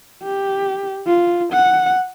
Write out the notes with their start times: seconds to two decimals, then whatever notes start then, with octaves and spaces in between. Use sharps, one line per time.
0.23 G4
1.06 F4
1.53 F#5